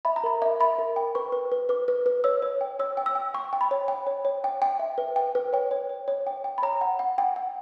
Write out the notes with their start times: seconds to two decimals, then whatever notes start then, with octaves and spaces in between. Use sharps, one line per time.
0.05 E5 B5
0.16 A#5
0.24 A#4 B5
0.42 E5
0.60 E5 B5
0.79 A#4
0.96 G5
1.15 B4 C#6
1.32 B4
1.52 B4
1.69 B4 D6
1.88 B4
2.06 B4
2.24 C#5 E6
2.42 C#5
2.61 G5
2.79 C#5 E6
2.97 G5
3.06 E6
3.15 G5
3.34 G5 C#6
3.53 G5
3.61 B5
3.71 C#5
3.88 G5
4.07 C#5
4.25 C#5
4.44 G5
4.62 G5
4.79 E5
4.98 B4
5.16 G5
5.35 B4
5.53 C#5 G5
5.71 C#5
5.89 C#5
6.08 C#5
6.27 G5
6.44 G5
6.58 B5
6.63 C#5 A#5
6.81 F#5
6.99 F#5
7.18 F#5 G5
7.36 F#5